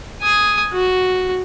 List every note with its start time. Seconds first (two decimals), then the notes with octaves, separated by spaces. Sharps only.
0.22 G#5 D#6
0.73 F#4